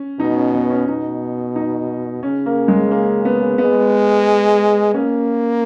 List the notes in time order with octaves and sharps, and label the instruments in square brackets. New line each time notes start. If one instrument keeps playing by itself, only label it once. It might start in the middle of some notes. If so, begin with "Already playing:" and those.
Already playing: [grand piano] C#4
[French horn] B2 [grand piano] D#4
[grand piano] C#4
B3
C#4
[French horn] B2 [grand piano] D#4
[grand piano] D#4
[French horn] C#3 [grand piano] C#4
[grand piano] A#3
G#3
A#3
B3
[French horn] G#3 [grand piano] B3
[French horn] A#3 [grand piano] C#4